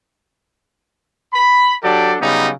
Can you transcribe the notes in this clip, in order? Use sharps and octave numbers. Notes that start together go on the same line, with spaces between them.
B5
F#3 D4 G4 A4 D5
C#3 F#3 G3 B3 D#4